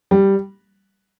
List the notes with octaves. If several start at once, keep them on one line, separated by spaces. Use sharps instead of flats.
G3